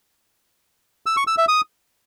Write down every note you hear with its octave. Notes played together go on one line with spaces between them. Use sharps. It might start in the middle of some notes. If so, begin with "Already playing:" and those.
E6
C#6
E6
E5
D#6